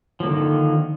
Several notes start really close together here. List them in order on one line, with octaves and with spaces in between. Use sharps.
F3 A#3 D3 D#3